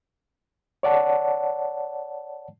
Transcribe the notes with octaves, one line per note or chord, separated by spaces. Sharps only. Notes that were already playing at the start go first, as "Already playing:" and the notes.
C#5 D5 F#5 A5